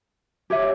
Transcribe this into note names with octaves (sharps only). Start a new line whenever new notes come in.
G4 C#5 E5